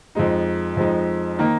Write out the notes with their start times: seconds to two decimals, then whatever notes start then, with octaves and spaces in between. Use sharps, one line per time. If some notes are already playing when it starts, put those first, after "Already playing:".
0.15 F2 F3 G#3 D#4
0.77 F2 F3 G#3 D#4
1.39 D#3 A#3 D#4